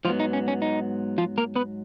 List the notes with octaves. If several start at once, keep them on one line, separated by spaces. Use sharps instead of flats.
G#2 F3 F#3 B3 F4
D#4
C#4
C#4
D#4
F3 F4
A#3 A#4
B3 B4